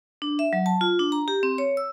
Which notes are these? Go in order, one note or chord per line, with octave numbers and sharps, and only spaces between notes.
D4
E5
F#3
A5
F4
D4
A#5
G4
C4
C#5
E6